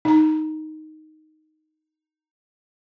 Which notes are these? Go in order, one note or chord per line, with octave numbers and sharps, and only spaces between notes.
D#4 A#5